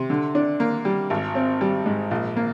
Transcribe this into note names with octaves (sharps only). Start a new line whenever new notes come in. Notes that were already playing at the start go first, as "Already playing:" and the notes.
Already playing: C3
D3
D4
A#3
G3
G#1
C4
G3
G#2
A#1
A#3